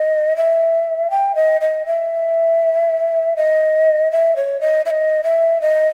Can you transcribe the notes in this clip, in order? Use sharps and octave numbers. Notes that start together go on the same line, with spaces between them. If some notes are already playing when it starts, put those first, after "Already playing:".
Already playing: D#5
E5
G5
D#5
D#5
E5
D#5
E5
C#5
D#5
E5
D#5
E5
D#5